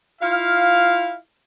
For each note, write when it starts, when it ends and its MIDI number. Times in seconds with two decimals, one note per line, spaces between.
0.22 1.15 64
0.22 1.15 65
0.22 1.15 77